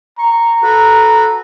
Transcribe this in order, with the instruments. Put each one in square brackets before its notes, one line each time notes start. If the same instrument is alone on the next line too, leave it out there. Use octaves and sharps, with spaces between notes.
[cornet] A#5 [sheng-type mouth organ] C#6
[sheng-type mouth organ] F#4 A4 B4